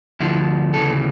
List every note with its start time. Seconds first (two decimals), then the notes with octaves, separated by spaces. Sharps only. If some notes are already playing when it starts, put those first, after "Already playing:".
0.20 D2 D3 F3 E4
0.74 D2 C#3 E3 A4